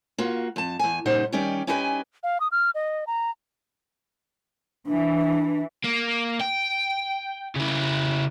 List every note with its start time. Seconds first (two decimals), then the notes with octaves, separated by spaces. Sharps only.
0.18 A#3 F4 F#4
0.56 F2 A5
0.79 E2 G#5
1.05 A#2 C#3 G3 D#4 C5 F#5
1.32 D#3 G3 C#4 D#4 G4 D5
1.67 C#4 D#4 E4 G4 B4 G#5
2.23 F5
2.40 D#6
2.52 F6
2.75 D#5
3.07 A#5
4.87 E3 D4
5.84 A#3
6.40 G5
7.55 C#3 E4